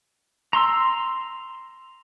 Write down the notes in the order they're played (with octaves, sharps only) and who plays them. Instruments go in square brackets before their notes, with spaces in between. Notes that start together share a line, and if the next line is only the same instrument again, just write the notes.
[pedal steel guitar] A#5 C6 E6